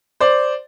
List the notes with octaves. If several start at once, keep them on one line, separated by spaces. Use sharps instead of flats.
C5 D5